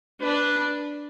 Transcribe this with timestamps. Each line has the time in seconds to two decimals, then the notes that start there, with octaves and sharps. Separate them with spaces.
0.21 D4 B4